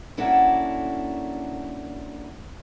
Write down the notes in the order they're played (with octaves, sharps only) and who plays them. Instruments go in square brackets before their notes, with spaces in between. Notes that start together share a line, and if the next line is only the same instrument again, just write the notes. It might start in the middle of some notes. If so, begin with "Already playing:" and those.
[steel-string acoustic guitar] A#3 C#4 D4 E4 F#4 A4